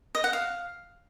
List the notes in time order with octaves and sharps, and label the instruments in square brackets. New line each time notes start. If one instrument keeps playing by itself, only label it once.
[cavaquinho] D#5
F#5
F5